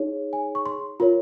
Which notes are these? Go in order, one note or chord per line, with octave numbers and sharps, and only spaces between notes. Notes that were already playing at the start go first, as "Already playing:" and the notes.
Already playing: D#4 G#4 C#5
G#5
C#6
C6
F4 A#4 C#5